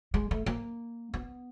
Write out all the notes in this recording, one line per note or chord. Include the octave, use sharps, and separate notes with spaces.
G#3
A3
A#3
B3